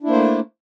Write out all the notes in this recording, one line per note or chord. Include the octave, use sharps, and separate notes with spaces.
A3 A#3 D4 E4 C5